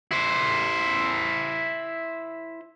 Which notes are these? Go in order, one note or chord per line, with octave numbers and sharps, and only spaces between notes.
E4 C5